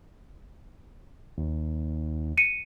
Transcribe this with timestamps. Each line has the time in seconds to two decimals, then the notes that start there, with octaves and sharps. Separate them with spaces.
1.38 D#2
2.38 C#7 D#7